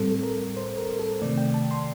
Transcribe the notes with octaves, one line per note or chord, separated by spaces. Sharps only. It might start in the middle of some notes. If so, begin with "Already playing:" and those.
Already playing: A2 G3 C4 A4
A4
A#4
C5
A#4
A4
C3 D#3 A3 C4 D5
G5
A5
C6